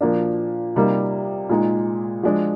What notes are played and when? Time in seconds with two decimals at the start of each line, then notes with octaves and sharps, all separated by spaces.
0.01 A#2 F3 A#3 D4
0.76 C3 G3 A#3 D#4
1.49 A#2 G#3 D#4
2.23 F3 G#3 D4